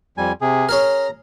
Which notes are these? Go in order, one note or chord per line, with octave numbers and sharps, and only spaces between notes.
F2 G3 G#5
C3 G#4
C#4 G#4 A#4 A#5